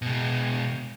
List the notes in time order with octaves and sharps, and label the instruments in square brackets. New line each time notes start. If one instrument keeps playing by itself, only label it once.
[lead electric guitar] B2 G#3